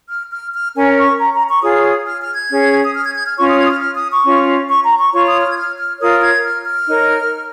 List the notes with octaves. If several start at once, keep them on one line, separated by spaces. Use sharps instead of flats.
F6
F6
F6
C#4 A#4 C#5 G#5
C#6
A#5
A#5
C#6
F4 G#4 C#5 D#6
F6
F6
G#6
C#4 G#4 C#5
D#6
F6
G#6
G#6
F6
C#4 F4 C#5 C#6
D#6
G#6
D#6
F6
F6
D#6
C#6
C#4 F4 C#5
C#6
A#5
C#6
F4 C#5 C#6
D#6
F6
G#6
F6
F6
F4 A#4 C#5 D#6
G#6
F6
F6
D#4 A#4 C#5